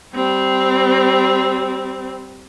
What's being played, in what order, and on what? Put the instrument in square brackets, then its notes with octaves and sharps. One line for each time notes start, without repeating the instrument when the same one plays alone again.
[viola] G3 C4